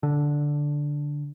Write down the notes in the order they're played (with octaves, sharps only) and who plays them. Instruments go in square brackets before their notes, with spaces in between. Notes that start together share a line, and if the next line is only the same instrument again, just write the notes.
[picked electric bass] D3